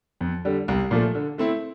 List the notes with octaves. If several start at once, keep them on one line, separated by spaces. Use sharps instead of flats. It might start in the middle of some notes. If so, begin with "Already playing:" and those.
F2
D3 G3
C2
A#2 F3 A3
D3
A3 C4 E4